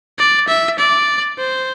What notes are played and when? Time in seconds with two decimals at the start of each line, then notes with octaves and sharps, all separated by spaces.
0.18 D5
0.48 E5
0.78 D5
1.38 C5